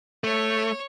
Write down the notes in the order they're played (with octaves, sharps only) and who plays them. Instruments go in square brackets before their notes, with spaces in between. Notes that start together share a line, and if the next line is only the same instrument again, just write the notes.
[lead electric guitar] A3 [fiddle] C#5